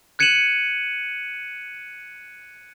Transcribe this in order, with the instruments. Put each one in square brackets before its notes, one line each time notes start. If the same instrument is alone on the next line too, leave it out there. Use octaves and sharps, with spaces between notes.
[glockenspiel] F#6 G#6 C#7 D#7 E7 F#7